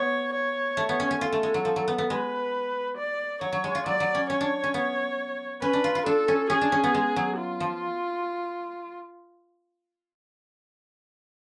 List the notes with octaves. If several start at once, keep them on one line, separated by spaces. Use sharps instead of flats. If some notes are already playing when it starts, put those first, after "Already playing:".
Already playing: B3 C#5
C#5
A3
B3
C#4
C#4
F4 A4
A3
G#3
F#3
F3
F#3
B3
B3
G#3 B4
D5
F#3 C#5
F#3
G#3
F4
F#3 D5
F#3
C#4
C#4 C#5
D4
C#4
B3
C#4 B4
D4
F4
F4
D4 A4
C#4
C#4 G#4
D4
C#4
B3
G#3
F#3
F4
F3